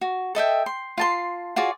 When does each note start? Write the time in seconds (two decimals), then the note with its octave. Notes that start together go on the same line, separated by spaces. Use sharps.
0.01 F#4
0.35 A4 D#5 E5 G5
0.66 C6
0.98 F4 A5 C6
1.56 F4 F#4 G#4 D5